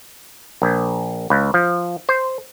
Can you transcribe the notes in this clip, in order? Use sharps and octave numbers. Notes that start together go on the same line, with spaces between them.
A#1
C#2
F3
C5